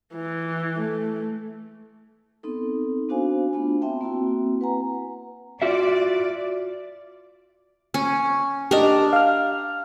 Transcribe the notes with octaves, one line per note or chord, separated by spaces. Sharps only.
E3
A3
B3 C4 D#4 A4
B3 D4 F#4 C5 F5 G#5
A3 B3 D4 F4
B3 C4 E5 G5 A5
A#3 C4 E4 F#4
B4 F#5 G#5 A#5
F4 F#4 D5 E5
C#4
D4 G4 A#4 D#5
F5 F6